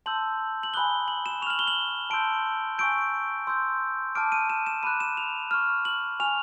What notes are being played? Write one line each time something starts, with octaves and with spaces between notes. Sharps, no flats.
A5 C6 E6 G6 F#7
F#7
G#5 B5 D#6 F#6 G7
F#7
E7
C#6 F6 F7 F#7
G7
F#7
A5 C6 E6 G6 D7
G#5 C#6 E6 G6 D7
C6 E6 G6
A5 D6 F6 D7
D#7
E7
E7
B5 D6 F#6 D#7
E7
F7
C#6 F6
F#7
G#5 C#6 F6 F7